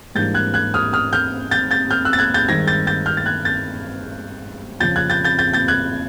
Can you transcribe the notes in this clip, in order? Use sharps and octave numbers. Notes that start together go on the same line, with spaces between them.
G#2 E3 G3 A#3 D4 G6 A6
F#6 G#6
F#6 G#6
D#6 F6
D#6 F6
F6 G6
G6 A6
G6 A6
F6 G6
E6 F#6
A6
F#6 G#6
G6 A6
G2 D#3 G#3 C4 G#6 A#6
G6 A6
G6 A6
F6 G6
A6
F#6 G#6
G6 A6
F2 C#3 F3 G6 A6
F#6 G#6
G6 A6
G6 A6
G6 A6
G6 A6
F#6 G#6